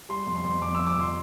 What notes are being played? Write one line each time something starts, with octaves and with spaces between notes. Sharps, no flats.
G3 C6
F2
C6
F2
F2 D6
E6
F2
D6
F2 C6